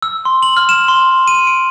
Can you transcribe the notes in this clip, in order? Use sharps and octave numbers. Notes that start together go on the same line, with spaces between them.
E6
C6
F#7
F6
E7
C6
D#7
D7